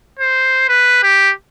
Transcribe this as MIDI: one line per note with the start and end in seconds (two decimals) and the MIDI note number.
0.19 0.67 72
0.69 1.03 71
1.03 1.32 67